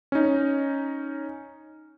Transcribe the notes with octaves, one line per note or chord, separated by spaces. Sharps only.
C#4 D#4